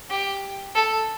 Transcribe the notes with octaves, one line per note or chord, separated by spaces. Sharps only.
G4
A4